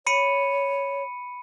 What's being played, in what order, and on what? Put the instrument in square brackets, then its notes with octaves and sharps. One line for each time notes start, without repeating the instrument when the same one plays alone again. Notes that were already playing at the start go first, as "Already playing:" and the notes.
[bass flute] C#5 [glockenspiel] B5 C#7 D#7